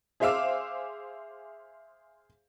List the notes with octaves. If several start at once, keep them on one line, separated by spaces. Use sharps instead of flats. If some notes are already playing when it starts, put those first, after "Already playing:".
G#4 C5 E5 F5 D6 E6